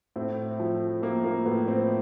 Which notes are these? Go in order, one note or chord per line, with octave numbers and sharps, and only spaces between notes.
A2 C4
F3
F3 A#3
A#3
A2 B3
C4